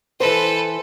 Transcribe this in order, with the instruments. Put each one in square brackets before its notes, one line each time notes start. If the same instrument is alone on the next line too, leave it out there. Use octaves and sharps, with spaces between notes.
[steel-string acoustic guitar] E3 C5 [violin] A4 B4